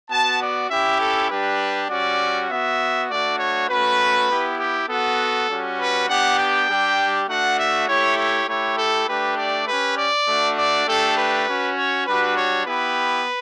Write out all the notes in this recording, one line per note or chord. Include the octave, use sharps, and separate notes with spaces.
B3 F#4 A5
D5
C#4 E4 G4 E5
A4
G3 D4 G4 B4
G3 C#4 F#4 D5
B3 F#4 E5
A3 D4 F#4 D5
C#5
A3 C#4 F#4 B4
B3 E4 G4
G4
B3 F#4 A4
G3 C#4 F#4
B4
B3 D4 G4 F#5
G5
G3 D4 G4
A3 D4 F#4 F#5
E5
A3 E4 G4 C#5
C#5
A3 E4 G4 C#5
A4
A3 D4 G4 B4
D5
C#4 G4 B4
D5
A3 D4 F#4
D5
A3 D4 G4 A4
B4
C#4 F#4
C#5
G3 D4 F#4 B4
C#5
B3 E4 G4 B4